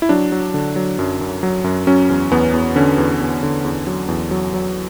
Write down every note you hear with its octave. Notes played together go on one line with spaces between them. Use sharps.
E4
F#3 D4
F#3
D3
F#3
F#2
F#2
F#3
F#2
F#3 C#4
E2
E2 B3
E2
D3 C#4
E2
E2
D3
E2
F#3
E2
F#3
F#3